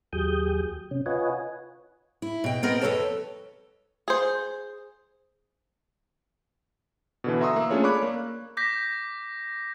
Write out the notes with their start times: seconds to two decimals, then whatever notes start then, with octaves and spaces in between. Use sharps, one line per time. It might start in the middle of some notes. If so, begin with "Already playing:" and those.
0.13 D#2 F#3 G4 G#4 D#6 G6
0.91 C3 C#4
1.06 F4 B4 C#5 D#5 F#5 G#5
2.22 E4
2.44 B2 G5
2.63 B3 C4 A#4 D#5
2.81 F2 G#3 A4 B4 C#5 A5
4.08 G#4 C5
7.24 B2 D3 E3
7.41 E5 A#5 C6 C#6 D#6 E6
7.56 A#3
7.70 A3 C#4 D4 F4 G#4 C#5
7.83 C#5 D5 B5 C#6 D6 F#6
8.03 A#3
8.57 D6 G6 A#6 B6